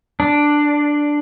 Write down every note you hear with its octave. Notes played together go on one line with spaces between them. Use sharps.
D4